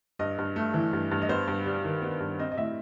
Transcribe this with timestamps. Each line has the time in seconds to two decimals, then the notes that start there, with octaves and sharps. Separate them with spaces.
0.19 G2 D#5
0.39 G2
0.56 A3
0.74 E3
0.93 G2
1.11 G2
1.22 D#5
1.29 B3 C5
1.48 G2
1.66 G3
1.84 D#3
2.02 B3
2.20 G2
2.39 C4 D#5
2.52 D#5
2.57 A2 E5